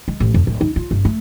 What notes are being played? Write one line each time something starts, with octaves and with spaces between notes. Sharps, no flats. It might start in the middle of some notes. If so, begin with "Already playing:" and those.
G#3
A1
F2
D1
D#4
F4
G1
A3